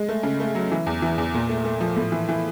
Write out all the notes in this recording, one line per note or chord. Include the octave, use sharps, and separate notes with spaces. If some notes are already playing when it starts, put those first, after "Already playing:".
Already playing: G#3
A3
C#3
A3
F#3
E3
E2
E3
E2
A#2
A3
A3
F3
A2
E3
E3